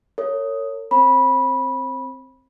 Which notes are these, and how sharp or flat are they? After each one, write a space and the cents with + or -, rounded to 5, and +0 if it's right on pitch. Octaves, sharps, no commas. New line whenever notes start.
A#4 -45 C#5 +0
C4 +0 C5 +40 B5 -15